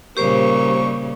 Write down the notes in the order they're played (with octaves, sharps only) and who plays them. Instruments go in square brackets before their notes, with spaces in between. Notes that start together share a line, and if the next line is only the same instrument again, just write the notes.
[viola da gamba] A#2 C#3 G3 [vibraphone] G4 C5 [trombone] A#4 [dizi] C#6